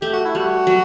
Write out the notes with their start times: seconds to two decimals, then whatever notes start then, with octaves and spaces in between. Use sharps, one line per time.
0.02 A3 G4
0.13 F#4
0.25 E4
0.35 G3 F#4
0.67 F#3